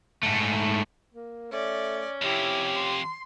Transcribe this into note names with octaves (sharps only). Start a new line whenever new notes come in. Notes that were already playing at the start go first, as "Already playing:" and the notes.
G#2 A3
A#3
A3 C#4 D5
F2 C3 E4 G4
C6